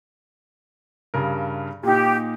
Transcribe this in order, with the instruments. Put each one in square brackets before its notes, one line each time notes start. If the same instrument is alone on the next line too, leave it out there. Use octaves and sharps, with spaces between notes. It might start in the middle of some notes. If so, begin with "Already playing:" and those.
[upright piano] G2 C#3 A#4
[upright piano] A#2 D#4 [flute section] G4